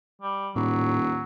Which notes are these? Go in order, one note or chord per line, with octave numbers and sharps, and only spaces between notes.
G3
D#1 A2 F#3